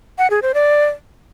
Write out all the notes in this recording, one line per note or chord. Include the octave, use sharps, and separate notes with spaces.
F#5
G#4
C5
D5